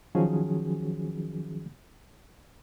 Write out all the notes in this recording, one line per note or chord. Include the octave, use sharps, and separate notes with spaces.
D#3 F3 F#3 C#4 F#4 G#4